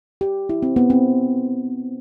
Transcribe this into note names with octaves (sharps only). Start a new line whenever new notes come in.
G4
E4
C4
B3
C4